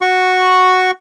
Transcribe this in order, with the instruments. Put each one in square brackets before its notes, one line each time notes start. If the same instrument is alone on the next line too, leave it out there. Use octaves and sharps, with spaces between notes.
[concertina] F#4 C#6